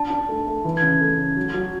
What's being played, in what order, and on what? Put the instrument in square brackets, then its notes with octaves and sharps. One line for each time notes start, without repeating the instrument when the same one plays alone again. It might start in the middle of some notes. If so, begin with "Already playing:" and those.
Already playing: [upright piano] D4 [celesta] A5
[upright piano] D4
A3
A3
E3
[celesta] G#6
[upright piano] C#3
A3
C#3
F#3
F#3